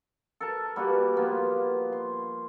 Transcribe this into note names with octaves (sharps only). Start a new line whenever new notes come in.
A4 A#4 A5
G3 A#3 F#4 B4
F3 A#3 B3
C6